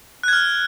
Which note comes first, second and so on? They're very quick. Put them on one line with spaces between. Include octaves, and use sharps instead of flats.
F#6 G#6 F6